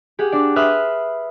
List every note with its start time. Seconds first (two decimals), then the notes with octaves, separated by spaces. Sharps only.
0.19 G4 G#4 F#5
0.32 D4 D5
0.56 B4 E5 C6 D#6 F6 F#6